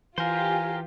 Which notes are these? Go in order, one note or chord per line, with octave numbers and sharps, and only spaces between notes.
E3 F4 G4 A#4 C5 G#5